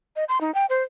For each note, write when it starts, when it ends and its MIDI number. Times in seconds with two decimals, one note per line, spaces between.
0.16 0.24 75
0.29 0.41 84
0.41 0.53 63
0.54 0.66 79
0.70 0.83 72